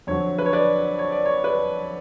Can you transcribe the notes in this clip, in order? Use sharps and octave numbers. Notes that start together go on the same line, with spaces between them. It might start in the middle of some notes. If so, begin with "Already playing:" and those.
F2 D3 F#3 C#5
B4
C#5
B4 D5
C#5
D5
C#5
B4 D5